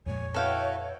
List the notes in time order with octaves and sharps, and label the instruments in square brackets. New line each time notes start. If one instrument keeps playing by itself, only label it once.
[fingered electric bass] F2 A#2 G#3 [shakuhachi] C#5 [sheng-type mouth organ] G#5
[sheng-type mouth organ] E4 F#4 B4 [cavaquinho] A4 F5 G5